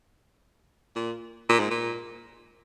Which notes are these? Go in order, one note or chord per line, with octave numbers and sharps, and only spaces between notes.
A#2
A#2
G#2
A#2